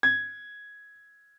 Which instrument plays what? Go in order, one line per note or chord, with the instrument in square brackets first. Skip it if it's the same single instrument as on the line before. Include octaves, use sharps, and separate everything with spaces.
[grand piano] G#6